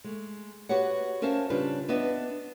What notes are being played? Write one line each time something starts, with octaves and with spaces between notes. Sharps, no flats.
G#3 A3
F#4 G4 B4 C#5 F#5
C#4 A#4 C5 E5 F5 A5
C#3 G3 D4 F4 G4 B4
B3 D4 B4 D#5 E5